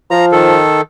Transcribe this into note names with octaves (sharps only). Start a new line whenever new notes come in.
F3 A#5
D#3 A4